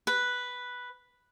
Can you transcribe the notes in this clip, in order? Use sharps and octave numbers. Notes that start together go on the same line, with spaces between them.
B4